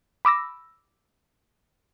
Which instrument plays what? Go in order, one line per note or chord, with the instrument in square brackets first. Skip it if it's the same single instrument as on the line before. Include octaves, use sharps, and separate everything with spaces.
[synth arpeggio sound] B5 D6 E6 A#6